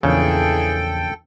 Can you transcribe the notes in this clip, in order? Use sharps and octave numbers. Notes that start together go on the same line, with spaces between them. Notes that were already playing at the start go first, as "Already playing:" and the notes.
A#1 E2 C#3 E3 G#4 A4 G5